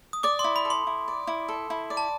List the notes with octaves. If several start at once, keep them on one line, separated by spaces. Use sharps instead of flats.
D#6
D5 D6
C6
E4
B5
A4
C6
E4
D5
E4
A4
E4
D5
A5